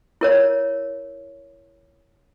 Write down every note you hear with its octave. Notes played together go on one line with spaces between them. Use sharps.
E4 A#4 C#5